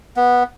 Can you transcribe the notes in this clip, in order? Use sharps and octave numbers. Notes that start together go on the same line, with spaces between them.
B3